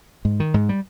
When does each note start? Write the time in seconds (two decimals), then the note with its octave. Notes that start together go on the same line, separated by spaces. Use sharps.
0.25 G#2
0.40 D#3
0.54 G#2
0.69 G3